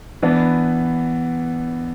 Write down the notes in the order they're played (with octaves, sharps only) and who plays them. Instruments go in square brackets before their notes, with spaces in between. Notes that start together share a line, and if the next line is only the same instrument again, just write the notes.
[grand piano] E3 B3 D4